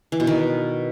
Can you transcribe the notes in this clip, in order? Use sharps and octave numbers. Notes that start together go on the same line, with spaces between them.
E3
B2
D#3